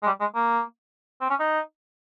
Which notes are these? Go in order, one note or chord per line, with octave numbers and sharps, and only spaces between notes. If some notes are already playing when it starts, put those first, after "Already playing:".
G#3
G3
G#3
A#3
C4
C#4
D#4